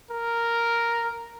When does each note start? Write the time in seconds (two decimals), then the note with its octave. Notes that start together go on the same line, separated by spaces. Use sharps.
0.11 A#4